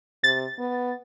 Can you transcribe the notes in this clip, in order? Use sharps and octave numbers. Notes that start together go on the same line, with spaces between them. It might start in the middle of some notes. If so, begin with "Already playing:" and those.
C3 A6
B3